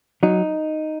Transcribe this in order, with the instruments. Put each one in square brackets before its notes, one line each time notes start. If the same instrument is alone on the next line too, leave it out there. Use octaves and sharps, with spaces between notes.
[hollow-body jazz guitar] F#3 D#4